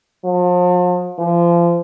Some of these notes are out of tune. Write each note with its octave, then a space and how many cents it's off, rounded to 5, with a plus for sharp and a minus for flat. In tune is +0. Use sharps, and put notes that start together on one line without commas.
F3 +40
F3 -30